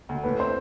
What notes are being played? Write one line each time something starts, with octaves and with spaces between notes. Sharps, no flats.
D2
A2 B4
C4 C5